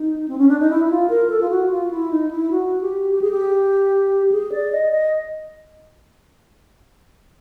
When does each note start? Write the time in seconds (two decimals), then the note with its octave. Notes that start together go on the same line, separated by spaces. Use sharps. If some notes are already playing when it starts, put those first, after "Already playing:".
Already playing: D#4
0.28 C4
0.38 C#4
0.49 D4
0.60 D#4
0.70 E4
0.86 E4
0.91 F4
1.10 A#4
1.30 A4
1.41 F4
1.50 F#4
1.71 F4
1.91 E4
2.11 D#4
2.31 E4
2.51 F#4
2.81 G4
3.12 G4
3.21 G#4
3.31 G4
4.32 G#4
4.52 D5
4.72 D#5
4.92 D#5